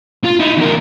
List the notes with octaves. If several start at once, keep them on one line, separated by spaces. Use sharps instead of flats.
F4
D#4 E4
E2 A#4